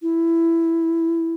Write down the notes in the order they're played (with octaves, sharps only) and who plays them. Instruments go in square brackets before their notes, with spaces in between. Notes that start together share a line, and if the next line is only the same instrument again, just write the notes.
[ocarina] E4